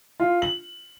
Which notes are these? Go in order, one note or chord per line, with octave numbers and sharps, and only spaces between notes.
F4
F#7